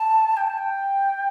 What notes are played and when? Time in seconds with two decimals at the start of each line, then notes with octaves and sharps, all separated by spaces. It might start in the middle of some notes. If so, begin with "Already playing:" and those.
Already playing: A5
0.37 G5
0.47 A5
0.58 G5